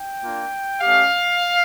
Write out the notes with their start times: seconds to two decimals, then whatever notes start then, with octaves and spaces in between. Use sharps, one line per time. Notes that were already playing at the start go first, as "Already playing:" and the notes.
Already playing: G5
0.22 A#3 D4 F4
0.82 A3 C#4 G4 F5